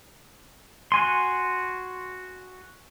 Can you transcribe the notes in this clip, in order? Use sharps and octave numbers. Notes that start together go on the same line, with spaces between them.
F#4 G#5 C6